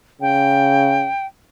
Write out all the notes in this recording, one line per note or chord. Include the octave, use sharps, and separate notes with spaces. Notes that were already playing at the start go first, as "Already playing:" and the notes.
C#3 G5